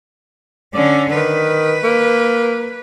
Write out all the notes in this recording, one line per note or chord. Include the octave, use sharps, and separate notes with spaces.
D3 C#4 D5
D#3 B4
A#3